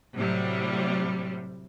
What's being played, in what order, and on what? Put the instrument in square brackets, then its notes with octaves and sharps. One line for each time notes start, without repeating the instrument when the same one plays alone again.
[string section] A2 C3 F#3 G3